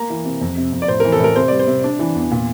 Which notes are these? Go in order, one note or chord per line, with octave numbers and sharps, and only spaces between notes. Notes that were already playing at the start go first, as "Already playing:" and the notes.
Already playing: A#3 A#5
E3
C3
F2
C3
F2
D5
A2 C5
E3 A#4
A4
A2 A#4
C3 C5
G3 D5
C5
C3
D4
E3
E2
A#2